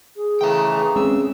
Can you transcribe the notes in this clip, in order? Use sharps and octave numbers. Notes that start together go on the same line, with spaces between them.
G#4
C#3 E3 A3 G5 A#5
G#3 C4 C#4 E6